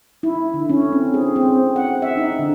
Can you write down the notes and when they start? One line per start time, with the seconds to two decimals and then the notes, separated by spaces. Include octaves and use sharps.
0.23 E4
0.54 D3
0.69 C#4
0.92 C4
1.14 G#4
1.36 C4
1.76 F#5
2.02 E5
2.17 D#4
2.39 D3